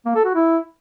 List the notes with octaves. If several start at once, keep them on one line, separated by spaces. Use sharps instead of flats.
A#3
A4
F#4
E4